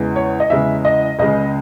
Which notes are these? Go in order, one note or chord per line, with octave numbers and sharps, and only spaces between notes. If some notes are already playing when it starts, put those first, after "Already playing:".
Already playing: E2 C#3 E3 G#3
C#5
D#5
E2 C#3 E3 G#3 E5
D#5
C#2 C#3 G#3 D#5